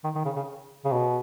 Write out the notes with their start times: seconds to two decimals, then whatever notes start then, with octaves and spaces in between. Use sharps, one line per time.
0.04 D#3
0.15 D#3
0.25 C#3
0.36 C#3
0.85 C#3
0.91 B2